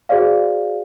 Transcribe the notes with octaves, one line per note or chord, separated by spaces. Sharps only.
F#4 G#4 C5 D5 F5